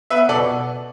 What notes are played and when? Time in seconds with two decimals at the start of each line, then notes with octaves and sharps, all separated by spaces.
0.10 B3 B4 E5
0.28 B2 A4 D5